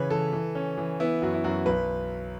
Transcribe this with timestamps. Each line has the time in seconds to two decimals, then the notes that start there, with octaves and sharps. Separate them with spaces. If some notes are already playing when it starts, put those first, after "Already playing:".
Already playing: C#3 E3 B4 C#5
0.10 E3 A4
0.33 E3
0.55 C#4
0.78 E3
1.00 B3 E4
1.22 F#2 F#4
1.34 E4
1.44 F#2 F#4
1.66 B1 B4